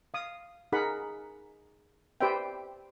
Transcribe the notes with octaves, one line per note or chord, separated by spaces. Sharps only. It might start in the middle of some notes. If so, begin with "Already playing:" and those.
F5 D#6
D#4 G#4 A#4 F#5 B5
G4 B4 C5 D5 E5 G5